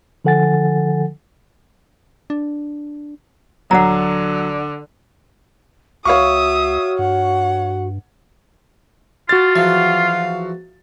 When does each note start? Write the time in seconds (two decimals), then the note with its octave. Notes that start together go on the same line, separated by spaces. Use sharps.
0.25 D3 F3 A4 F#5 G#5 A6
2.30 D4
3.71 D#1 D3 F#3 F#5 A#5
6.05 C#2 F#4 C#5 E5 F5 C#6 D#6
6.99 G2 F#5
9.29 F4 F#4 A6
9.56 E2 F3 F#3 F5